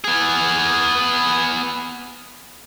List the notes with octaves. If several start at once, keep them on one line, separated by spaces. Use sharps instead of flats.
B3 G#4